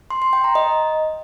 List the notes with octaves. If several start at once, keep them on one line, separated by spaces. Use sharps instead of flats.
C6
C6
G5
A#5
D#5